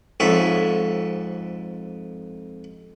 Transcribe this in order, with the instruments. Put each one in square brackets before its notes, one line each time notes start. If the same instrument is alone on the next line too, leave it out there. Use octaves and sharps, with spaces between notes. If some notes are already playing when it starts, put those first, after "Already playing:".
[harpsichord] F2 G#2 C#5 E5